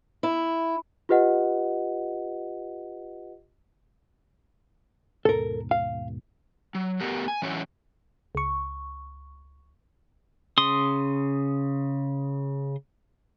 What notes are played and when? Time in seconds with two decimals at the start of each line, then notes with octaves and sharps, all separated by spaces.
0.23 E4
1.09 F4 G4 B4 D#5 F#5
5.25 D#2 G#2 B2 A4 A#4
5.71 F5
6.75 F#3
7.00 A3 B3 F#4 G4 A#4
7.28 G#5
7.42 E3 F#3 C#4 E4 F#4 C#5
8.35 C#2 C#6
10.58 C#3 C6 D#6